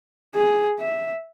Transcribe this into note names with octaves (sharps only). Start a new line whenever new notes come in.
G#4
E5